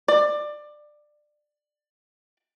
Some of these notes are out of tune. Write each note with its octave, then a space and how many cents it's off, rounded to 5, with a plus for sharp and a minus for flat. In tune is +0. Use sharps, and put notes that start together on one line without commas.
D5 +20